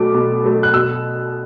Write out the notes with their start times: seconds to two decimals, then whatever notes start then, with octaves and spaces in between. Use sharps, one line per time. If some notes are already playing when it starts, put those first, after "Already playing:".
Already playing: B2 F#3 A3 D6
0.14 B2
0.44 F#3 A3
0.63 F#6
0.73 B2 E6